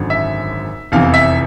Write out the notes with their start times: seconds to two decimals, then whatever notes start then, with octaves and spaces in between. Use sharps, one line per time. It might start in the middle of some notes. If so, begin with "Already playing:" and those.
Already playing: G#1 F#2 D3
0.10 E5
0.92 F1 E2 C3 E3 F5
1.14 E5